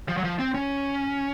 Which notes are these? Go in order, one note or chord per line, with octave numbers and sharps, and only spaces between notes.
F3
F#3
F3
C4
C#4